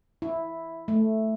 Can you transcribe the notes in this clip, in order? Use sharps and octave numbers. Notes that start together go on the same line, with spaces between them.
E4
A3